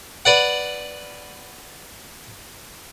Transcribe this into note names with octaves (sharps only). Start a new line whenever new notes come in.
B4 D5 F#5